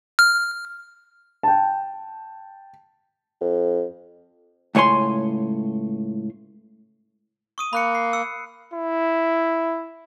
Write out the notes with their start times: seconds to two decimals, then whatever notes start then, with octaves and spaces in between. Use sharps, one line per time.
0.19 F6
1.43 G5 A5
3.41 F2
4.75 C#2 A2 C#5 G#5 C6
7.58 C#6 D#6 D#7
7.73 A#3 B5 F#6 C#7
7.95 C7
8.13 E6 C#7
8.74 E4